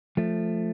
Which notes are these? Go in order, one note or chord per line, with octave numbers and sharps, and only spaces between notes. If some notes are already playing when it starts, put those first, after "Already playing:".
F3 A3